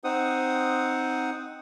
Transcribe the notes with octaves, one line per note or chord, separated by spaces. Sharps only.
C4 D#4 C5 F#5 D#6